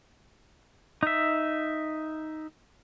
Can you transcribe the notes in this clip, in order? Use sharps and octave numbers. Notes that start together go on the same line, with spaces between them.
D#4 E5